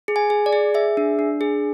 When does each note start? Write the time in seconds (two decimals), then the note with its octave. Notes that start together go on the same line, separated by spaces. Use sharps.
0.08 G#4
0.16 G#5
0.30 G#4
0.46 D5
0.53 G#4
0.74 G#4 E5
0.97 D4
1.19 D4
1.41 G#4